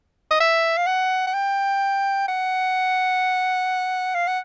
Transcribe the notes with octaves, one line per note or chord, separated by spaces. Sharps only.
D#5
E5
F5
F#5
F#5
G5
F#5
F5
F#5